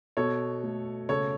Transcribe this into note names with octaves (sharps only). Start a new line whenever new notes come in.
B2 A4 C#5
A3
C#3 A4 C#5